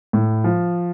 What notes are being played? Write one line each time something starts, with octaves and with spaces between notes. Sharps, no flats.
A2
F3